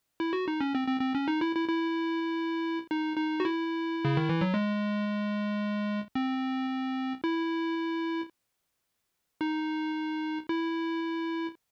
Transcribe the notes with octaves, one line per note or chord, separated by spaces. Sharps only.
E4
F#4
D#4
C#4
C4
C4
C4
C#4
D#4
E4
E4
E4
D#4
D#4
F#4
E4
C#3
D#3
E3
F#3
G#3
C4
E4
D#4
E4